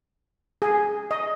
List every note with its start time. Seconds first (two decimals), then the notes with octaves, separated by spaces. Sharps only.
0.62 G#4
1.11 D#5